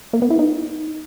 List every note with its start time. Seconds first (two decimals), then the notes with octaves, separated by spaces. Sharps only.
0.13 A#3
0.22 B3
0.30 E4
0.39 D#4